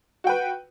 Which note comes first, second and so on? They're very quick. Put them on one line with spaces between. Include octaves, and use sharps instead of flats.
F#4 G5 B4